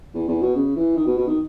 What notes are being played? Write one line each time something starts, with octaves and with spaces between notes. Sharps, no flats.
E2
E2
B2
C#3
E3
D#3
B2
B2
D#3